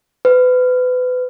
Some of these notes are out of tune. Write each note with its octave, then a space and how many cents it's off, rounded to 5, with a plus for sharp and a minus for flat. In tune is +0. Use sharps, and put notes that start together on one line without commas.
B4 +30